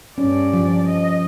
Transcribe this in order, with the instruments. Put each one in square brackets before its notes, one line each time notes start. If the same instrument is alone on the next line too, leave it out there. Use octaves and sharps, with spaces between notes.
[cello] G2 D5 [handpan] C#4
[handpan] F3
[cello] D#5